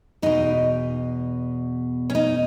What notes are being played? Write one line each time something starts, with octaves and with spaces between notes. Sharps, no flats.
E2 B2 D#4
C#4
D#4